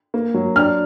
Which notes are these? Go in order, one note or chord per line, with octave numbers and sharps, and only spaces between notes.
A#3
F#3
D4 F6